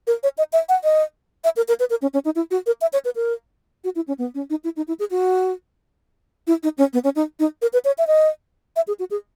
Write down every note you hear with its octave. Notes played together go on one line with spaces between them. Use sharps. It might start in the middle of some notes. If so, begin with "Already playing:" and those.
A#4
C#5
D#5
E5
F#5
D#5
E5
A#4
A#4
B4
A#4
C#4
C#4
D#4
E4
F#4
A#4
E5
C#5
B4
A#4
F#4
E4
C#4
B3
C#4
D#4
E4
D#4
E4
G#4
F#4
E4
D#4
C#4
B3
C#4
D#4
D#4
A#4
B4
C#5
E5
D#5
E5
G#4
F#4
G#4